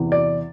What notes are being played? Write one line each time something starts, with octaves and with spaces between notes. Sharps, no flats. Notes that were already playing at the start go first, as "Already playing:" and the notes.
Already playing: E2 C3 E3
D5